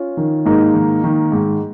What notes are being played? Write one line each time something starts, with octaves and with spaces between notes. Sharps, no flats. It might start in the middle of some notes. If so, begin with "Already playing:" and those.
Already playing: C#4 F4
D#3
G#2 A#3 D#4
D#3
D#3
G#2